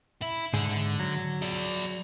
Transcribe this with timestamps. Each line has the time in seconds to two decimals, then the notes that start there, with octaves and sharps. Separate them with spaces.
0.22 E4
0.53 G#2 D3 D4 G#4
1.00 F#3
1.42 G#4 D5